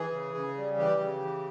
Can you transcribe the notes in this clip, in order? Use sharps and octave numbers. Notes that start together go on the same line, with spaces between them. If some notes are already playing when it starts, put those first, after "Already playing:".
Already playing: E3 G#4
C#3
C#3
G3
E3 G4
C#3
E3